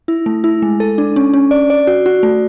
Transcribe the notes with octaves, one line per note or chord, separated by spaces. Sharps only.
E4
A3
E4
G#3
A4
D4
C#4
C#4
D5
D5
F#4
F#4
A3